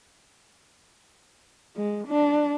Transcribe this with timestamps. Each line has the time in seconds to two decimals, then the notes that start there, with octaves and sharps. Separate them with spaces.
1.77 G#3
2.07 D4